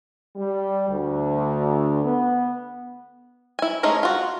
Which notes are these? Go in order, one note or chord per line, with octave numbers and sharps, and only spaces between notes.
G3
D2
B3
E4 G#5
G#3 A3 C#4 D#4 G#4
F4 F#4